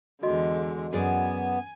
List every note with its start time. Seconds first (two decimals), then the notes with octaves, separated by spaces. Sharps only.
0.23 E2 D3 G#3 F#4 D#5 C6
0.93 F#2 B3 G#4 D5 G#5